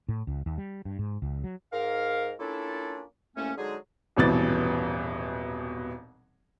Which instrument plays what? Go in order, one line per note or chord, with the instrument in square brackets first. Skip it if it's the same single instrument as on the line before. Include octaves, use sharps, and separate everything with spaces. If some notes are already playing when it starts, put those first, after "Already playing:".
[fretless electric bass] A2
C#2
D#2
G3
G2
G#2
C#2
F#3
[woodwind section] G#2 A#4 F5
A#3 C#4 D4 E4 F4 A4
C2 A2 A3 A#3 C#4
D3 F#3 G#3 D#4 G#4
[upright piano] D#1 G#1 B2 E3 A6